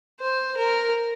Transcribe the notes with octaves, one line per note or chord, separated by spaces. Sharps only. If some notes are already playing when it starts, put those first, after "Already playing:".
C5
A#4